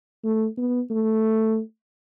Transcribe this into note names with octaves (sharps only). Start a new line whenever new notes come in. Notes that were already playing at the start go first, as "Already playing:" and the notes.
A3
B3
A3